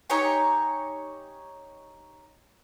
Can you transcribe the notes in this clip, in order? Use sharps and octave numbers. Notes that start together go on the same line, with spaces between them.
D#4 G4 C#5 G#5